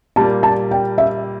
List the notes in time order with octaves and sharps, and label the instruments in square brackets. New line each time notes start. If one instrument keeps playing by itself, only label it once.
[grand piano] A#2 G3 A#3 [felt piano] A5
[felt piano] A5
G5
E5